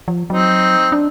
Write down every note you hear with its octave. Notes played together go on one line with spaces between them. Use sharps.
F3
F#3 C4 D#4
D4